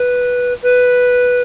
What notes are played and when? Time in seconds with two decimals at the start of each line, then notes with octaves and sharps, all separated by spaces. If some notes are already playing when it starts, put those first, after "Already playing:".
Already playing: B4
0.62 B4